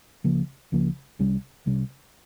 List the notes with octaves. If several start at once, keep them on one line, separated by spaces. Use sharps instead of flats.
C#2 C#3 F3 A#3
C#2 C#3 F3 A#3
C2 C3 G3 C#4
C2 C3 G3 C#4